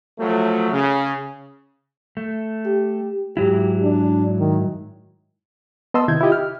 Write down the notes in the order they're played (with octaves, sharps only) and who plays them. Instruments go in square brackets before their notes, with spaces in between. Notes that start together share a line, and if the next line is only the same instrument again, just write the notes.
[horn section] F3 F#3 A3
C#3
[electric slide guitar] A3
[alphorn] G4
[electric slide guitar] G#2 F#3 E4 [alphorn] G4
[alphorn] D4
D#3
[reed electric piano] B3 D#5 A5 C6 E6
C3 D#3 E4 G6 G#6
E4 F4 G4 D#5
F6